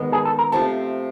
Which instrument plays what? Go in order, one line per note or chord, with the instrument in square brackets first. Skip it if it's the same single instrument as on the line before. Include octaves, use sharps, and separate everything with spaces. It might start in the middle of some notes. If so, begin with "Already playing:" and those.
Already playing: [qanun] D#3 G#3 B3
[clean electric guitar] G#4
A4
A#4
[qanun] C3 F3 A3 [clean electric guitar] A4